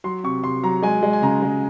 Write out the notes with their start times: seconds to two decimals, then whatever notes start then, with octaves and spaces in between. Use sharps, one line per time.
0.04 F#3 C6
0.24 C3 C#6
0.44 C3 C6
0.63 F#3 A#5
0.82 G#3 G#5
1.03 G#3
1.13 G#5
1.22 C#3 A#5
1.42 G#3